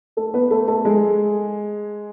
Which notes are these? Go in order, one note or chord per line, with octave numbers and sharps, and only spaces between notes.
A3 A4
B3 B4
A3 A4
A3 A4
G#3 G#4